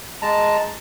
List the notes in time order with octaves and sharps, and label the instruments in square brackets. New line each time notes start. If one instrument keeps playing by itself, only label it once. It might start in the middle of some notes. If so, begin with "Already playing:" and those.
[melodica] G#3 A5 A#5